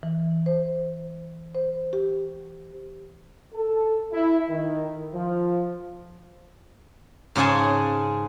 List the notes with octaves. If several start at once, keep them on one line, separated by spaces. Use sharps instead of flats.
E3
C5
C5
G4
A4
E4
D#3
F3
G#2 C#3 G#4 G#5 A5